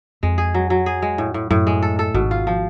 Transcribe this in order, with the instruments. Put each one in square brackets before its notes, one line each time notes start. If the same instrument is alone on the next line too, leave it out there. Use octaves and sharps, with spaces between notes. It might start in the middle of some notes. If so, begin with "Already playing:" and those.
[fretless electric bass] F2 [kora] G#3
[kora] G#4
F#3
F#3
G#4
G#3
A2
A2
[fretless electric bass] F#2 [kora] A2
[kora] G#3
A4
A4
[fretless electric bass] G#1 G#2 [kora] B2
[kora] F4
F3